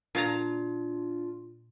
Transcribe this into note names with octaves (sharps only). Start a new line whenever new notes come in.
A#2 D4 F4 A5 A#5